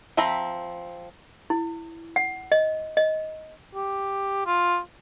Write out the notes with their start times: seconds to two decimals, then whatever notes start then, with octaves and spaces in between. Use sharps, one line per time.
0.17 F3 C4 E5 A#5 B5
1.50 E4
2.16 F#5
2.52 D#5
2.97 D#5
3.75 G4
4.46 F4